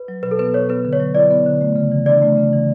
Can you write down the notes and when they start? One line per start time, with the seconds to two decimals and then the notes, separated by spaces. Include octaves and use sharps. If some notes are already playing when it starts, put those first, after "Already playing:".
Already playing: B4
0.08 F#3
0.23 B2 B4
0.31 A4
0.39 B3 B4
0.54 B2 C#5
0.69 B3 B4
0.85 D3
0.93 C#5
1.00 F#3
1.15 E4 D5
1.31 B3
1.46 D3
1.61 A3
1.76 C#3
1.92 E3
2.06 D4 D5
2.22 A3
2.37 C#3
2.53 E3